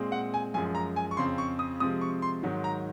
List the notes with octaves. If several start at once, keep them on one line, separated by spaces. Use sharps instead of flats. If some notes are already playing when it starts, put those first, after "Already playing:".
Already playing: A#2 G#3 C4
F#5
G#5
F#2 F3 G#3 G#5
A#5
G#5
C#6
F2 C#3 F3 C4 C6
C#6
D#6
C3 F3 G#3 C4 D#6
C#6
C6
G#2 D#3 F#3
A#5